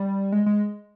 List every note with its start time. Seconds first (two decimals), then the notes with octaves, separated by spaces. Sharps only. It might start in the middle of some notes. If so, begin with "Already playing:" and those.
Already playing: G3
0.32 G#3
0.46 G#3